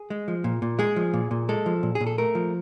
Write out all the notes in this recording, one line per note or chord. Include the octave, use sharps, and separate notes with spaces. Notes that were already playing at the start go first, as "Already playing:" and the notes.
Already playing: G#4
G#3
F3
A#2
A#2
G#3 G#4
F3
A#2
A#2
G#3 A4
F3
A#2
G#4
A#2
A4
A3 A#4
F3